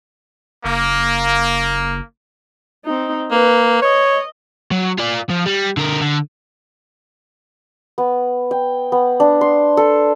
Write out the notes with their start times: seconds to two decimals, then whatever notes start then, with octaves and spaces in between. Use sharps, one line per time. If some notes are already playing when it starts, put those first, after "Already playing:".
0.65 F#1 A#3
2.85 C4 D#4
3.31 A#3 B4
3.82 C#5 D#5
4.72 F#3
4.99 F4 D5
5.30 F3
5.46 G3
5.77 D3 A#4
6.01 D3
7.98 B3
8.51 G5
8.92 B3
9.20 D4
9.41 C6
9.77 A4